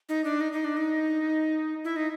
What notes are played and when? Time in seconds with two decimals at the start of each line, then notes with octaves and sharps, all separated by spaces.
0.09 D#4
0.24 D4
0.41 D#4
0.52 D#4
0.64 D4
0.77 D#4
1.85 E4
1.96 D#4